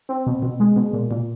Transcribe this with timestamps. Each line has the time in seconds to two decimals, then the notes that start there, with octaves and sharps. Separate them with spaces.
0.09 C4
0.26 B2
0.42 B2
0.60 G#3
0.76 B2
0.93 A#2
1.11 A#2